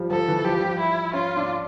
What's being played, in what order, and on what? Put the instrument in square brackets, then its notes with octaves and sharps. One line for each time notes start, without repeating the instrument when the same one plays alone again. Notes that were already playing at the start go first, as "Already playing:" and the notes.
Already playing: [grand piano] F3 G3
[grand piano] F3 [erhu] A4
[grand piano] E3
[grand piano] F3 [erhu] G4
[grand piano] G3
F3
[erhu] E4
[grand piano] C#4 [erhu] F4
[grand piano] D4